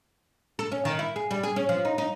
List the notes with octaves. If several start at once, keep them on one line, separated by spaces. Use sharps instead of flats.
A4
C#4
D#3
E4
G#4
G3
G#4
C#4
F3
D#4
D#4